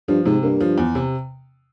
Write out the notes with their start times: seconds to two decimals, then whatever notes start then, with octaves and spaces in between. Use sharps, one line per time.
0.08 G2 F3
0.25 G#2 C3
0.43 G2 A#3
0.60 F3
0.78 E2
0.95 C3